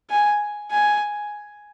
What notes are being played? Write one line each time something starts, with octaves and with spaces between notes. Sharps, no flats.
G#5
G#5